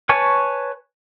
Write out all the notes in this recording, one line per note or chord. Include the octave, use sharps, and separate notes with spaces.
B4 C#5 G#5 A5 C#6